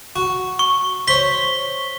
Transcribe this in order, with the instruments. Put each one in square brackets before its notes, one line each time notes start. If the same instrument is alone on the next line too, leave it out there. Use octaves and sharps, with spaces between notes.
[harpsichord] F#4
[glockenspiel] C#6
[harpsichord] C5 C#5 [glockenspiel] B6 G7